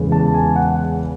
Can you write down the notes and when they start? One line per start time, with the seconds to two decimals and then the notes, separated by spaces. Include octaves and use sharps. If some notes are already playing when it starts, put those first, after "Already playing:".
Already playing: E2 C#3 G#3
0.12 A5
0.34 G#5
0.56 F#5